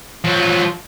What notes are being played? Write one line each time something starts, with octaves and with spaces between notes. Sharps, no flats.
F3 F#3